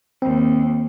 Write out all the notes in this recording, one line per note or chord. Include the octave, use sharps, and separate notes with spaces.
D#2 C4